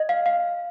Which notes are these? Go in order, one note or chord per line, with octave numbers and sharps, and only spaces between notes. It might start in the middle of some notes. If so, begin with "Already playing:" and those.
Already playing: D#5
F5
F5